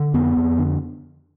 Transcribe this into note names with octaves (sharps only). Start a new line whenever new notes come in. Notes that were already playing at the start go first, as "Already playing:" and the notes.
Already playing: D3
F2 B3
F2
D3